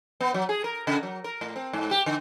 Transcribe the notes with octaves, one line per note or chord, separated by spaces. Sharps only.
B3
F#3
G#4
A#4
C#3
F#3
A#4
A2
C4
G#2
G4
D3